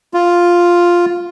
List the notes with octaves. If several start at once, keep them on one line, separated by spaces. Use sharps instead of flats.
F4